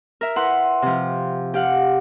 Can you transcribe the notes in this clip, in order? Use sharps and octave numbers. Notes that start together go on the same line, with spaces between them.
A#4 E5
E4 B4 F#5 C6
C3 F3
G4 F5 F#5